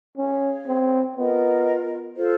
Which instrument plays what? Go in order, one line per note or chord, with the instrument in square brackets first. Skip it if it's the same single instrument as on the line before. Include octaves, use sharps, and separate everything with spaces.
[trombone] C#4 [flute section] G#4 C#5 F5
[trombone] C4
[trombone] B3 [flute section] F4 A#4 D#5
[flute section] F4 A4 C5